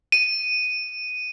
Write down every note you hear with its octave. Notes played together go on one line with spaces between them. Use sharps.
D#7